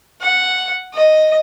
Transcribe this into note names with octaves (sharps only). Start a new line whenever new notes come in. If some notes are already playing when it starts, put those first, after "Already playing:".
F#5
D#5